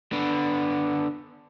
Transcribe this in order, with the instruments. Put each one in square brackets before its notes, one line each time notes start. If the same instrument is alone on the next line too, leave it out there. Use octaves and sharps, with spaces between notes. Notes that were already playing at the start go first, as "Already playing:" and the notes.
[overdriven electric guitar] D3 B3